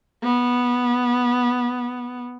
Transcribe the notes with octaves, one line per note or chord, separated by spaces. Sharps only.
B3